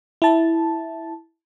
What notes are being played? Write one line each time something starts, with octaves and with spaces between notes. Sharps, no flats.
E4 A5